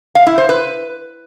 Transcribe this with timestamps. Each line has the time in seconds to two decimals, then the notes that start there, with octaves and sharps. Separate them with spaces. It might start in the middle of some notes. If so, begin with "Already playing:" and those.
0.15 F5
0.27 E4
0.38 C5
0.49 B4